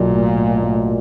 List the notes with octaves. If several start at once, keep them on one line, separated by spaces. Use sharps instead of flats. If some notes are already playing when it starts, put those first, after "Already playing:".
Already playing: B1 A#2 F#3
A2
A2
A2